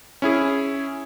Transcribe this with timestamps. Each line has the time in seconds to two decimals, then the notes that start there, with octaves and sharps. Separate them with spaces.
0.22 C#4 E4 G#4